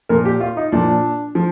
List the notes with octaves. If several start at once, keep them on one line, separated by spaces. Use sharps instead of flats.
A#2 F3 A#4
G4
F4
D#4
A#2 F3 D4
F3